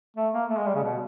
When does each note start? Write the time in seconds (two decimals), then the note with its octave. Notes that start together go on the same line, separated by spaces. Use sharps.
0.17 A3
0.34 A#3
0.50 A3
0.58 G#3
0.67 G3
0.75 C#3
0.84 B2